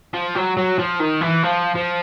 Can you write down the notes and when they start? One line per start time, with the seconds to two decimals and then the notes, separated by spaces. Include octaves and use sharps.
0.14 F3
0.36 F#3
0.57 F#3
0.79 F3
1.00 D#3
1.21 E3
1.43 F3
1.75 F3